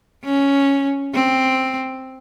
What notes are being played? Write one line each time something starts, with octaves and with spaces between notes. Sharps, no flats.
C#4
C4